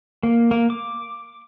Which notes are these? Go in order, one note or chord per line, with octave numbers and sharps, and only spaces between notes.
A#3
A#3
D6